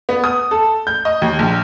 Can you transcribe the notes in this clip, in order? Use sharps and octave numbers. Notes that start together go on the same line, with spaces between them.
B3
D#6
A4
G6
D#5
D#2
A#1